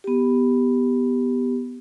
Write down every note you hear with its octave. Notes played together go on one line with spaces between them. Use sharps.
B3 G4